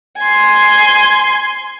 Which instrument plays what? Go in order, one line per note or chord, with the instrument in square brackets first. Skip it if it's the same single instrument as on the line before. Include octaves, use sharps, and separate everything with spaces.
[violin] G#5 C6